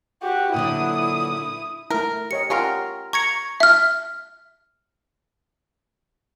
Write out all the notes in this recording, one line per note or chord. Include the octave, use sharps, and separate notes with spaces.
F#4 G4
A#2 D3 F#3 E4 D#6
A3 E4 A#4
G4 C#5 D#5 C#7
C#4 F4 G4 A#4 C#5 F#5
A#5 C#6 G#6 C#7
E5 F6